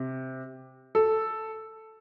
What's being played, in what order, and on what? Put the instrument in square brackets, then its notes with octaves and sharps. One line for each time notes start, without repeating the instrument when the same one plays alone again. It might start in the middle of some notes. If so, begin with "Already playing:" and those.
Already playing: [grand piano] C3
A4